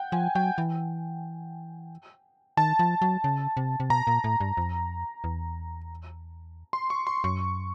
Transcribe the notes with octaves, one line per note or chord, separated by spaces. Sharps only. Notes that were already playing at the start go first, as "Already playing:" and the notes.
Already playing: F#5 G5
F3 G#5
F#3 G5
E3
D#3 A5
F3
F#3
C#3
C3
C3
B2 A#5
A#2
A2
G2
F2
E2
C6
C#6
C6
F#2 C#6